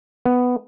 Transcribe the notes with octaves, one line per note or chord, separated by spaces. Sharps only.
B3